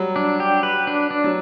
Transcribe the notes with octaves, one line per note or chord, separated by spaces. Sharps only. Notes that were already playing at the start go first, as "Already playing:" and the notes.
Already playing: F#3 G3
D4
G4
B4
D4
D4
F#3